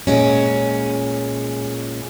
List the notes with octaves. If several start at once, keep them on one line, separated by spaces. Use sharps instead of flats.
A#2 G#3 C#4